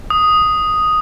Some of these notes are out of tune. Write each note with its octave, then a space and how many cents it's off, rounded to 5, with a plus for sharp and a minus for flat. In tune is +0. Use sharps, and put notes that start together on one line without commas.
D#6 +0